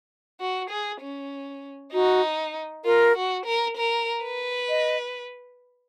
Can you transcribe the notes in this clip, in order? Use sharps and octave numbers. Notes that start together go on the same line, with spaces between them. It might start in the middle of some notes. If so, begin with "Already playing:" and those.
F#4
G#4
C#4
D#4 F#4
F4 A#4
F#4
A#4
A#4
B4
D#5